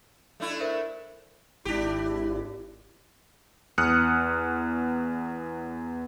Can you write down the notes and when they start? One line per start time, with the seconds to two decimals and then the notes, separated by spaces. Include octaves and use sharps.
0.40 A3 D4 E4
0.60 A#4 C5 E5
1.65 G#1 D4 E4 G4
3.78 E2 D#6 F6 F#6 C#7